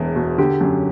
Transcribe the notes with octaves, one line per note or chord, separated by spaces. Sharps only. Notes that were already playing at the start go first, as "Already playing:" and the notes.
Already playing: E1 E2 E3
B2
D3 G4
F#2